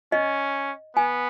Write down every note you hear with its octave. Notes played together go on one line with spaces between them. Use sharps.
C#4 D#5
B3 G#5